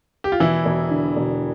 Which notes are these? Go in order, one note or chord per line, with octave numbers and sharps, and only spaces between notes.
G4
F4
E1 E3 E4
E1
D3
E1